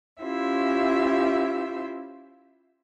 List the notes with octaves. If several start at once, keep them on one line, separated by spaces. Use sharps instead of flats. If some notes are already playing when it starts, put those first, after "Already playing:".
C#4 E4 F4 G4 C5 E5